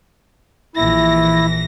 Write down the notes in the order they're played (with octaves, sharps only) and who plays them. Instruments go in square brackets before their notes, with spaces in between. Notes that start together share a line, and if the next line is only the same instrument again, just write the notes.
[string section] A#1 E3 A#6 [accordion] E4